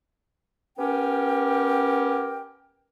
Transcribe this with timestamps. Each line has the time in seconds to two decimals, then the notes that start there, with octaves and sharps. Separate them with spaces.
0.78 B3 C#4 G4 A#4 G5